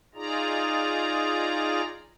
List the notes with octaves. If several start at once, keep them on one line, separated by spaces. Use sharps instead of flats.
D#4 F4 G#4 D5 A#5